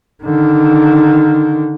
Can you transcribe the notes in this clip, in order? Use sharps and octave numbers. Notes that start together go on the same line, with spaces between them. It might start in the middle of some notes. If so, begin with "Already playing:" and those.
D3 D#3